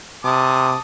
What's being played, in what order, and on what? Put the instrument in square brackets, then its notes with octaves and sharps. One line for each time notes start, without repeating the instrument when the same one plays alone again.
[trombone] C3 [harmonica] A5 D6 D#6